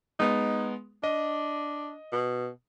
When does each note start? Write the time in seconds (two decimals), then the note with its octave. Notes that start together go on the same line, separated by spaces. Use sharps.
0.20 G#3 B3 D#4
1.04 D4 D#5
2.12 B2